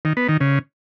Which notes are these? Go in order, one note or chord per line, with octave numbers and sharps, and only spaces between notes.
D#3
B3
D#3
C#3